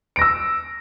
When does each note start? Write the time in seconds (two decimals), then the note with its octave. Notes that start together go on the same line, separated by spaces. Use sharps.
0.16 D7
0.19 A#6
0.22 E6